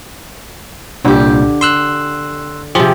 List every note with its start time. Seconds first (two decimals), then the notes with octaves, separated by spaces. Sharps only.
1.05 C2 A#2 D3 G4
1.61 C6 E6 F#6
2.75 C3 F3 G4 G#4